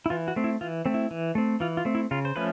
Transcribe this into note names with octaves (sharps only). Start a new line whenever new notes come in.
E4
E3 F4
F#4
A3 C4
E4
E3 F4
A3 C4
E4
E3
A3 C4
E3 F4
F4
A3 C4
E4
C#3 F4
C5
F3 A3 C#4 B4